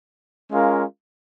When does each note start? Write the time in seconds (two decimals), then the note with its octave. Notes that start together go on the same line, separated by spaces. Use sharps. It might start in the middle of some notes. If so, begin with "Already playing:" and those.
0.52 G#3 C#4 F4 A#4 F5